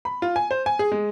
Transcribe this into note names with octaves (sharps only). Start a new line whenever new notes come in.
B5
F4
G#5
C5
G#5
G#4
G#3